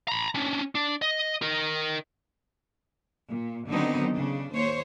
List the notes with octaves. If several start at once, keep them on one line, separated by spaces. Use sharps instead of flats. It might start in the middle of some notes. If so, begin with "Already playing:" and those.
A#5 B5
C#4 D4
D4
D#5
A#4 D#5
A#2
D3 D#3 F#3 B3 C4 D#4
C#3 D4
D#2 C5 C#5